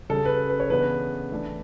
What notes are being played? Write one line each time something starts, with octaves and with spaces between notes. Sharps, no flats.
C#3 G3 C#4 A4
B4
B4
C#5
C#3 E3 B3 D4 B4
E3 A3 D4